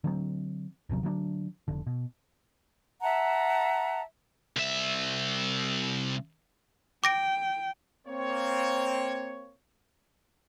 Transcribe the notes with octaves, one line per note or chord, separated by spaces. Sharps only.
D3 F#3 G3 C4
D#1 G#1 C3 F#3
D3 F#3 G#3 D4
F1 D3
B2
E5 F#5 A5 A#5
C2 E5
G5 D6 A#6 D7
A#3 C4 C#5